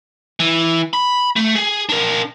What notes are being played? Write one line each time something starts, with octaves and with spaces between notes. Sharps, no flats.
E3
B5
A3
G#4
D4 A#4